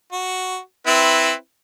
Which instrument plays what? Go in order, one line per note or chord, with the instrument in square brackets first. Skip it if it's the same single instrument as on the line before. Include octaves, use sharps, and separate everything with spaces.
[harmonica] F#4
C4 E4 B4